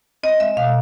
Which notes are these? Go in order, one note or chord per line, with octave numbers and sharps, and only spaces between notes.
C4 D#5
G#3 E5
B2 F5